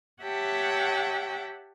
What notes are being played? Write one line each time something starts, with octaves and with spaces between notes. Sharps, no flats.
G4 C#5 E5 F#5 G5 A5